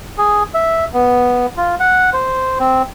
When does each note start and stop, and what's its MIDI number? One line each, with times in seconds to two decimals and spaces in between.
0.18 0.43 68
0.54 0.85 76
0.94 1.46 59
1.57 1.75 65
1.80 2.10 78
2.13 2.58 72
2.60 2.82 60